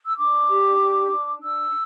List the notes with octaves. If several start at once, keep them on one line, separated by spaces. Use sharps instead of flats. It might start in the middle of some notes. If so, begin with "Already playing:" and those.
E6
D4 D6
G4
D4
D4
D4 E6